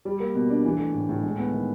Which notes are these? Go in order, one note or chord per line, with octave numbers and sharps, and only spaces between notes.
G3
A#3
B2
D4
E3
A3
A2
A2
G#3
B3
D#3